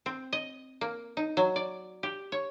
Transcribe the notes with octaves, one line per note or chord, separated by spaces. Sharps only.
C4
D#5
A#3
D#4
F#3
D5
G4
C#5